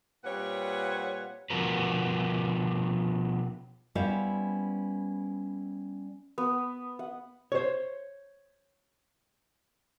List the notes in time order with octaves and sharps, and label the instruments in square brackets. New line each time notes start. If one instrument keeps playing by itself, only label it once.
[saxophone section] A#2 G3 C4 B4 C#5 F#5
[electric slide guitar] B2 F3 F#4 A#4 B4
[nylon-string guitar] G3 B3 C#4 E4 C5 F5
[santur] B3
F#5
[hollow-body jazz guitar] C5 C#5